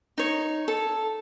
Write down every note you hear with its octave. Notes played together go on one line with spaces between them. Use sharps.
D#4 C#5
A4